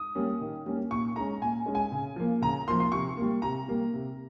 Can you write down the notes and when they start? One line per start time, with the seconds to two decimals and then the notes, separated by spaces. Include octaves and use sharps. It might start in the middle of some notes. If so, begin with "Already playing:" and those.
Already playing: D#6
0.15 G3 A#3 C#4
0.41 D#3
0.66 G3 A#3 C#4
0.91 A#2 C#6
1.16 G#3 C#4 A#5
1.41 A#2 G#5
1.66 G#3 C#4
1.75 G#5
1.92 C#3
2.16 F3 A#3
2.42 C#3 A#5
2.68 F3 A#3 C6
2.80 C6
2.92 C3 C#6
3.17 G3 A#3
3.42 C3 A#5
3.68 G3 A#3
3.94 C3